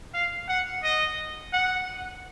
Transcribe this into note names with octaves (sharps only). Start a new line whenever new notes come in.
F5
F#5
D#5
F#5